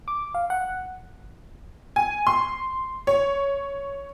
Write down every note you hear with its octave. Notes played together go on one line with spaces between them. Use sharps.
D6
F5
F#5
G#5
C6
C#5